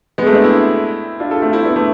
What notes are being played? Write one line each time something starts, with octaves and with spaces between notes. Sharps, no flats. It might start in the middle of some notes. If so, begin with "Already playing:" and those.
G#3 B3
A3 C4
B3 D4
C4 E4
D4 F4
F4 A4
A3 C4
C4 E4
B3 D4
A3 C4